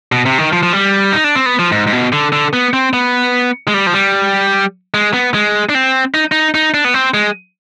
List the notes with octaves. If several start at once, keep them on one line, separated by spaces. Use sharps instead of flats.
B2
C3
D#3
F3
F3
G3
D#4
D4
C4
B3
F3
G#2
G#2
B2
D3
D3
B3
C4
B3
G#3
G3
F3
G3
G#3
B3
G#3
D4
C4
D#4
D#4
D#4
D4
B3
C4
G#3